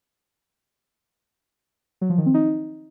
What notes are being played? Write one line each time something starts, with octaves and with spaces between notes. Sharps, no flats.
F#3
F3
D#3
C4
D#4